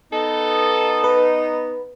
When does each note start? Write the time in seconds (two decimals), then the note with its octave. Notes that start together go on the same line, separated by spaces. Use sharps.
0.12 B3 D#4 A4
1.04 B4